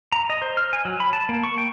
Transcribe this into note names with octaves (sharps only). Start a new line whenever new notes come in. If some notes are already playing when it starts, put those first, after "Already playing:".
A#5
D#5
C5
F6
G#5
F#3
B5
A5
A#3
C#6
G5